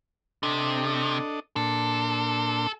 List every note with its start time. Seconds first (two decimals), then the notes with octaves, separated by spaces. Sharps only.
0.43 C3 D4 A4 D#5
1.56 A#2 D4 A4 C6